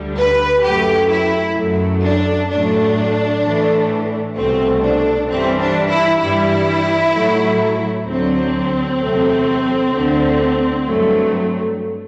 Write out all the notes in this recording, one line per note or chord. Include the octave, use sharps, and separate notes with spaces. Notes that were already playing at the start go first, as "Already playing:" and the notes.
Already playing: D2 D3 G3
B4
F#2 F#3 A3 G4
E4
F#2 F#3 A3
D4
A2 F#3 A3 D4
A2 E3 A3
C2 B2 A3 C4
D4
G2 E3 G3 C4
D4
E4
G2 E3 G3 E4
A2 F#3 A3
D2 D3 F#3 C4
E2 C3 F#3 A3
D2 D3 A3
G2 F#3 A3